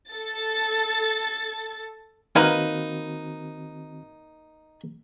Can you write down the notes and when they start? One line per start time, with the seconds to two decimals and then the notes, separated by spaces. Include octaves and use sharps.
0.10 A4 A6
2.36 D#3 A#3 C4 D#4 F#4 B4